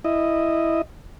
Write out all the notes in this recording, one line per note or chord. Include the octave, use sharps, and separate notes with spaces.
E4 D#5